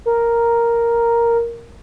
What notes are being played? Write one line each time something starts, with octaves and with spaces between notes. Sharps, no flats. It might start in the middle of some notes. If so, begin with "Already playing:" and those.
A#4